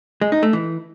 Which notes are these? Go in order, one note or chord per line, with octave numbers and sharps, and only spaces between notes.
G#3
D#4
A3
E3